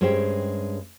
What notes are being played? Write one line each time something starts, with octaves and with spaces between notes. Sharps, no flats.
G2 G#3 C#4 G4 C5 G5